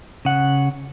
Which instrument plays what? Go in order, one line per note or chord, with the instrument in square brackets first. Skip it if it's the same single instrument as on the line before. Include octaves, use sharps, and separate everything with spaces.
[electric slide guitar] C#3 F#5